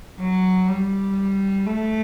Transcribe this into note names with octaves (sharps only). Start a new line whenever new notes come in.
F#3
G3
A3